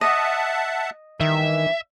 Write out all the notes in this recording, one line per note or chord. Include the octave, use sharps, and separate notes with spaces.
D#5 E5 F#5 A5
G2 D#3 E3 E5